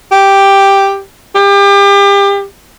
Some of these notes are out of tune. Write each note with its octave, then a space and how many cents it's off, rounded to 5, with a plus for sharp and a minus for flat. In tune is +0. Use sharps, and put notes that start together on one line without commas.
G4 +5
G4 +30